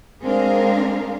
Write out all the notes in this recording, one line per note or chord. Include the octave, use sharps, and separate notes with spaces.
G#3 C4 D4 G#4 A#4 F5